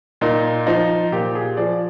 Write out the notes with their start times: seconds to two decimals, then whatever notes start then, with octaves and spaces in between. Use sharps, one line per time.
0.21 A#2 D#4
0.67 F3 D#4
1.12 A#2 G4
1.35 G#4
1.57 F3 D5